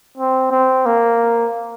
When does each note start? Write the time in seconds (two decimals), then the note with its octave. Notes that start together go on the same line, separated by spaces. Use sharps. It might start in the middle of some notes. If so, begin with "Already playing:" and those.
0.18 C4
0.51 C4
0.86 A#3